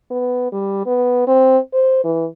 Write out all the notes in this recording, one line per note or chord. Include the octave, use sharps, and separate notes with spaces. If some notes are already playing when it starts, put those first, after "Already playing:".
B3
G3
B3
C4
C5
E3